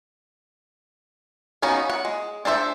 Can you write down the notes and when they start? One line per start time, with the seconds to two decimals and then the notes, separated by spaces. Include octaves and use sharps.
1.62 B3 C#4 D#4 F#4 F5
1.90 F#5
2.05 G#3
2.45 D4 A4 C5 E5